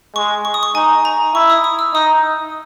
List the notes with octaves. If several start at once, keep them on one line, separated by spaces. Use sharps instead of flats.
G#3 C#6
C#6
D#6
C#6
D#4 G#5
A#5
E4 C#6
D#6
D#6
E6
D#4 D#6